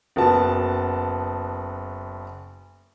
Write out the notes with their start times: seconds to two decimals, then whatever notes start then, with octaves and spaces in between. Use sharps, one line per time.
0.16 F#1 B3 F#4 A5